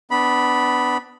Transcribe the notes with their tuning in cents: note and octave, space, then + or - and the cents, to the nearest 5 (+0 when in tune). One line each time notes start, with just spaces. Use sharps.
B3 +20 D4 +0 B5 -10